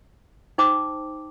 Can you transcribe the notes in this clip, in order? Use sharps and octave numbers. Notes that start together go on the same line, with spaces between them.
D#4 C5 G5 A5 D6